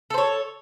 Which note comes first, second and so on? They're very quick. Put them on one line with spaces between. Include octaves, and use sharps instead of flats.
A4 C5 C#5